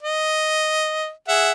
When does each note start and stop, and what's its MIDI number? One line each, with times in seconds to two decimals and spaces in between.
0.03 1.10 75
1.28 1.52 68
1.28 1.52 76
1.28 1.52 78